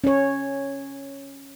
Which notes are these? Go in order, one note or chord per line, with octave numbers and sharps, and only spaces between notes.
C#4 C#5